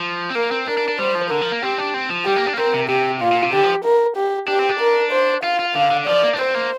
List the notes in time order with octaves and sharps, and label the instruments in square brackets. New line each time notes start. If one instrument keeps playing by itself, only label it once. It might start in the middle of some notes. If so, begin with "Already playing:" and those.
Already playing: [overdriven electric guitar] F3
C4
[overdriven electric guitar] A#3 [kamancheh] A#4
[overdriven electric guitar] C4
[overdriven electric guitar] D4 [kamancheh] A#4
[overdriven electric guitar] D4
D4
[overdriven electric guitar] G3 [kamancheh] C5
[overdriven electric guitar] F3
[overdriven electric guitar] D3 [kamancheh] A#4
[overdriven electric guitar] F3
A#3
[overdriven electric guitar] C4 [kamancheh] G4
[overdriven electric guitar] D4
C4
F3
[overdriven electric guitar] G3 [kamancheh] G4
[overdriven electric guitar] A#3
D4
A#3
[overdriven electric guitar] C4 [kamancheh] A#4
[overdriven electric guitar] C3
[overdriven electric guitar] C3 [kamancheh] G4
[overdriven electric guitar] A#2 [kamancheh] F4
[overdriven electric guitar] A#2
C3
[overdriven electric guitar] D3 [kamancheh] G4
[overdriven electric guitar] F3
[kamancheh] A#4
G4
[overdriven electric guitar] D4 [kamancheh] G4
[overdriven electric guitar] C4
D4
[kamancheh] A#4
C5
[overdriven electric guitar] F4 [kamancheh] F5
[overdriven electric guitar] F4
[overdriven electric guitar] D3 [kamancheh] F5
[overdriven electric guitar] D3
[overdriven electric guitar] F3 [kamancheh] D5
[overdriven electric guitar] A#3
D4
[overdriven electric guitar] C4 [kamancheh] C5
[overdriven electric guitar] A#3